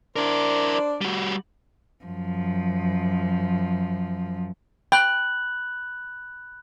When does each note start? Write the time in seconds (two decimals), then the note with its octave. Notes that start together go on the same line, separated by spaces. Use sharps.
0.16 D4 E4 A#4 C5 D5
1.01 G3 F#4
2.05 F#2 F3
4.92 G5 B5 F#6 F#7